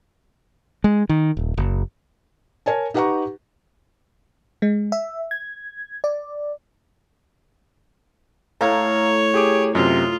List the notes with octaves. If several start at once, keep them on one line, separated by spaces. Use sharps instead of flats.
G#3
D#3
D#1
F#1
A#4 C#5 G#5 A5
D#4 G4 B4 F#5 A#5 C#6
G#3
E5
G#6
D5
A2 A4 C#5 F5 A#5
G4 G#4 D6
F#2 C3 F4 D#5